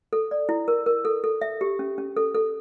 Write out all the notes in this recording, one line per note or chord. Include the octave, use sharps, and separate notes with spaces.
A4
D5
E4
A#4
A#4
A4
A4
E5
G4
C#4
C#4
A4
A4